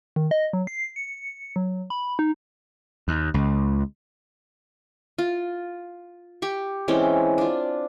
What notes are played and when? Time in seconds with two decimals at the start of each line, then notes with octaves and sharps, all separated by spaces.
0.16 D#3
0.31 D#5
0.53 F#3
0.67 C7
0.96 C#7
1.56 F#3
1.90 B5
2.19 D#4
3.08 D#2
3.34 C#2
5.18 F4
6.42 G4 C#6
6.88 E3 G#3 C4 C#4
7.38 D4 F4